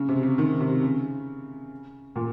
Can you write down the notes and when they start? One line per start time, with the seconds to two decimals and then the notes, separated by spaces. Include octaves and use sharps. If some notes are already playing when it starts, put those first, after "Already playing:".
Already playing: C#3
0.09 C3
0.23 C#3
0.38 D#3
0.60 C3
0.82 C#3
2.16 A#2